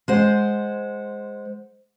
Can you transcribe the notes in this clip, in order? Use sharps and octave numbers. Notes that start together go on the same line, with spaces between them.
G#3 C5 F#5